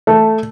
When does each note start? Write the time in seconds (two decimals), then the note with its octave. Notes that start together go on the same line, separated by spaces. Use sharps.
0.07 A3